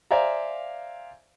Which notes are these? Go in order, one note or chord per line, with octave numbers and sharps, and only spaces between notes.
C5 D5 E5 F5 G#5 A#5